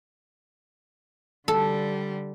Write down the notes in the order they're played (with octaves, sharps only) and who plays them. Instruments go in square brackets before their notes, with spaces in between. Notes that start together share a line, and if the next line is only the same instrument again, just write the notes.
[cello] D3 G3 [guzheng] A4